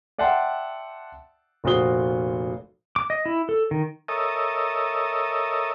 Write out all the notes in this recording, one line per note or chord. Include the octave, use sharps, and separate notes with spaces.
D5 E5 F#5 G5 A5 C6
F1 A#2 F#4 C5 D#6 G7
D6
D#5
E4
A4
D#3
A4 A#4 C#5 D#5 E5 D#6